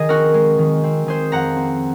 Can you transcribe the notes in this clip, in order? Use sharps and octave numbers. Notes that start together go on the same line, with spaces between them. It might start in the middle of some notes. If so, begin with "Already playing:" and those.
Already playing: D#3 G#4 D#5
C4 F#4 A#4
G#3
D#3
C4
D#3 G#4 C5
F2 F#5 A#5
C4